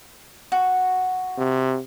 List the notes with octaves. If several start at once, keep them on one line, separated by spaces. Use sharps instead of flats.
F#4
C3